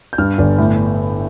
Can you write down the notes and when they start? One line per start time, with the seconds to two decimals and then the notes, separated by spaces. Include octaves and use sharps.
0.13 G6
0.18 G2 F6
0.38 G1 D5
0.58 A2